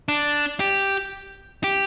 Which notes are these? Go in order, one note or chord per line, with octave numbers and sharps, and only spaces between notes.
D4
G4
G4